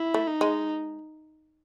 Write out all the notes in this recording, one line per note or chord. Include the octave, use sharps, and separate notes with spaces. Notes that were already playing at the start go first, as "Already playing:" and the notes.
Already playing: E4
A3
D#4
G#3